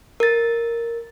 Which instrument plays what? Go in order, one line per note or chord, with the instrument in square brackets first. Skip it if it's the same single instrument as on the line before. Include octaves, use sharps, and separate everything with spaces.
[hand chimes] A#4 A6